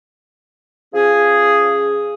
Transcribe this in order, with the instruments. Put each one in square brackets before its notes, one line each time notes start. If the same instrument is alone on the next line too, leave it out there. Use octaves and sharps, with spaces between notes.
[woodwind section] F3 C#4 G#4